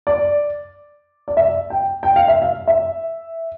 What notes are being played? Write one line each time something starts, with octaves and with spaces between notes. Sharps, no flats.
D5
D5
E5
G5
G5
F5
E5
F5
E5